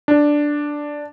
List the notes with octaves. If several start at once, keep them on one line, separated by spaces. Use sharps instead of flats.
D4